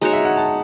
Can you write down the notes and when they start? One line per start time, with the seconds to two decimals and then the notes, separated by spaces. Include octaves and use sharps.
0.01 G#3 D#4 F#4 C#5
0.13 E5
0.25 F#5
0.37 A5